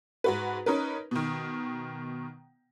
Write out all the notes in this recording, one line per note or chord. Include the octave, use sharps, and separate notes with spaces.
G#2 F#4 B4
C#4 D#4 A#4 B4
B2 D#3